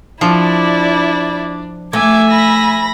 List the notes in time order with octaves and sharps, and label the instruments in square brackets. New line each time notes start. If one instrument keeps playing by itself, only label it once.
[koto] F3 [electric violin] D4 [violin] E4 D5
[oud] A3 [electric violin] E5 G#5 [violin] D6 G#6
[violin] B5 A#6